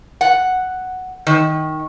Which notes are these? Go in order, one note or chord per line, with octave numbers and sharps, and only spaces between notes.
F#5
D#3